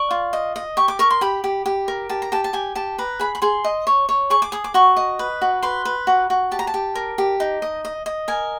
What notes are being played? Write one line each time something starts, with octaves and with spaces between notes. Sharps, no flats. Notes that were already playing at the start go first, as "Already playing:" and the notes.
Already playing: D5 C#6
F4
D#5
D#5
G4 C#6
D6
A#4 C#6
C6
G4 B5
G4
G4
A#4
G4 A5
A#5
G4 A5
A5
G4 G#5
G4 A5
B4 A#5
G#4 B5
B5
G#4 C6
D#5
C#5
C#5
G#4 C#6
D6
G#4 D#6
D6
F#4 C#6
D#5
B4
F#4
B4 C6
B4
F#4
F#4
G4 A5
A#5
A5
G4
A#4
G4
D#4
D#5
D#5
D#5
A#4 G#5